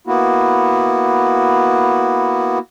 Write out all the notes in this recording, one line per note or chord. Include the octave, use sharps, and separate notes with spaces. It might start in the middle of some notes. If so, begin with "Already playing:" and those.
A#3 B3 E4 F#4